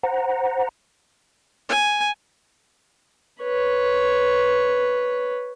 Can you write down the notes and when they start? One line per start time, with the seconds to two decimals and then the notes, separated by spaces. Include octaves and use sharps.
0.03 C5 F#5 A#5
1.69 G#5
3.42 B4 C#5